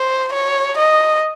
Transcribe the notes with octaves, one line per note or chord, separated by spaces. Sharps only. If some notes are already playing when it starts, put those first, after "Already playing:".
Already playing: C5
C#5
D#5